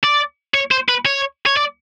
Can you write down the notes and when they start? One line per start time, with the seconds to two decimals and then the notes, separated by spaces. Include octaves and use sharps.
0.04 D5
0.54 C#5
0.71 C5
0.89 B4
1.06 C#5
1.46 C#5
1.57 D5